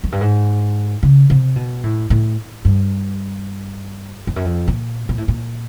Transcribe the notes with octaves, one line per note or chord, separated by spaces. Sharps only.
F#2
G2
G#2
C#3
C3
B2
A2
A2
G2
F2
F#2
F2
A#2
A#2
A2
A#2